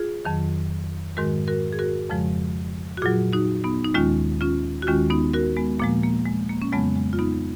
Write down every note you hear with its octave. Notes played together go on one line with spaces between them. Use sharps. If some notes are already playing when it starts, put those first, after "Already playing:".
Already playing: F4 G#4
F2 D#3 F#3
G#2 D#3 G#3 F#4 A#4
F#4 A#4
G#4
F#4 A#4
F2 C#3 F3 G#3
F#4
A#2 F#3 F4 G#4
D#4 F#4
B3 D#4
D#4
D#2 D#3 G#3 C#4 F4
C#4 F4
F#4
D#2 D#3 G#3 C#4 F4
B3 D#4
F#4 A#4
G#3 B3
A#2 F3 G#3 A#3
A#3
G#3
A#3
C#4
F2 C#3 F#3 G#3 B3
G#3
F4
B3 D#4